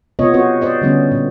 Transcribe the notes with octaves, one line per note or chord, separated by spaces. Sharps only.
C3 B3 F4 C#5 D#5
C4 F#4 C5 C#5
C5 D5 D#5
D3 G3 B3 C#4
A#2